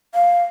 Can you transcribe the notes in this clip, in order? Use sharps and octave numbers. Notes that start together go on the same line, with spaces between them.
F5